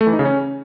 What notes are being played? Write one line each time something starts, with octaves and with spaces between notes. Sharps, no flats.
A3
E3
D#4
C#3
C#4